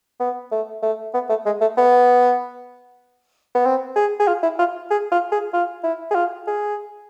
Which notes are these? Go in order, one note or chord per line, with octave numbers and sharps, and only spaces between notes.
B3
A3
A3
B3
A3
G#3
A3
B3
B3
C4
G#4
G#4
F4
E4
F4
G#4
F4
G#4
F4
E4
G#4
F4
G#4